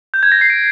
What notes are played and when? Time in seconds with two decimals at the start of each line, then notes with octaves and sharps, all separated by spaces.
0.14 G6
0.23 G#6
0.32 A#6
0.41 C7
0.50 D7